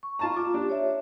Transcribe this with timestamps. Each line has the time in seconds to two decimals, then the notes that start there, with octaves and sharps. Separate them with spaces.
0.03 C#6
0.19 F4 A5 A#5
0.37 F4 D6
0.54 D4 G4
0.70 C#5 E5